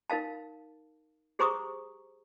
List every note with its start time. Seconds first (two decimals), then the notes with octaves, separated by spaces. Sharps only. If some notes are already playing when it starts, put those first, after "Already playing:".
0.10 D#4 A#4 F5 A5
1.39 G4 G#4 C5 A#5 C#6 D#6